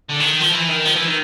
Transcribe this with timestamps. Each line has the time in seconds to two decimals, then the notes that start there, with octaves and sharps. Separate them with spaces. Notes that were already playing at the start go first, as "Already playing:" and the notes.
0.10 D3
0.20 D#3
0.40 F3
0.52 E3
0.69 D#3
0.85 F3
0.96 E3
1.07 D#3